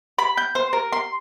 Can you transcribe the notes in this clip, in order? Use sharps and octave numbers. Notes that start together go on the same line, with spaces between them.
B5
G6
C5
A#4
C6